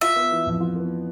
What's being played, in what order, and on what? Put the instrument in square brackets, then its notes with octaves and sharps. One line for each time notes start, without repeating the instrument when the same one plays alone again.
[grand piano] F4 [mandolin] E5
[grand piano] B3
E3
F2
F4
B3